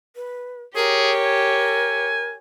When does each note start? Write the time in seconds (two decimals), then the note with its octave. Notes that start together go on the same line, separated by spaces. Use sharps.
0.16 B4
0.76 G4 G#4 A#4 C#5
1.23 G#5